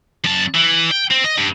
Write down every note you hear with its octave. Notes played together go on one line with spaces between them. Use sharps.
F#2 A5
E3
G5
C4
D#5
G2